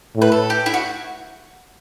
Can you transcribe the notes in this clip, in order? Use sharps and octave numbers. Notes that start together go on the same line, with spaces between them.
A2
B4
A4
G4
E4
F#4